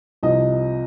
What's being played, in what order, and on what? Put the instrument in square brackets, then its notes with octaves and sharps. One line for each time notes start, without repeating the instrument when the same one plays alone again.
[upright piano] C2 C3 F3 D#5